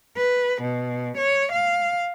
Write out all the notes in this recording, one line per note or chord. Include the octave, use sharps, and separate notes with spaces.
B4
B2
C#5
F5